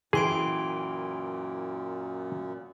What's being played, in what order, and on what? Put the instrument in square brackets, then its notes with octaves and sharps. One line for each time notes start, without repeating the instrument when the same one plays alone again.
[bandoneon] F#2 A#2 [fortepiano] E3 [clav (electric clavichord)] G#4 [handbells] G5 C6 D7